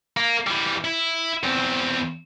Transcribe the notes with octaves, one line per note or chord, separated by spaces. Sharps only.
A#3
E3 G3
E4
E2 C4